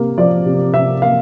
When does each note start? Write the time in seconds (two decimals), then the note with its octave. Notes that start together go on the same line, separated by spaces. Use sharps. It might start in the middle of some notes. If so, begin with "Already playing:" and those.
Already playing: C3 A#3
0.18 F3 D5
0.46 C3
0.73 C3 E5
1.02 A#3 F5